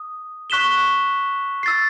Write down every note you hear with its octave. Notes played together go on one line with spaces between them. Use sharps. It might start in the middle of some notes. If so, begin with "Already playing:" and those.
Already playing: D#6
C#6 F#6 B6 E7 G7
E6 A6 C7